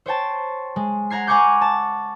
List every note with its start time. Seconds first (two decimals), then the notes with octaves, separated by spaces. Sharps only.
0.06 C5 C#5 G5 A5
0.76 G#3
1.10 F#5 A#5 G#6 C7
1.27 F#5 G#5 A#5 C#6 D6 G6
1.61 A5